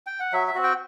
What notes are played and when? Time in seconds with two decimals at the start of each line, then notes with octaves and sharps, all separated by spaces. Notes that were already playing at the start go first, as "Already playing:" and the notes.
0.07 G5
0.20 F#5
0.33 F#3 E5
0.47 E5
0.55 C4 F#4
0.63 G5